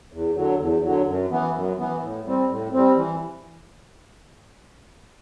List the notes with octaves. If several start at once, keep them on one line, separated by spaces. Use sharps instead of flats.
E2
D3 F#3
E2
D3 F#3
F#2
E3 B3
F#2
E3 B3
A2
G3 C4
A2
G3 C4
E3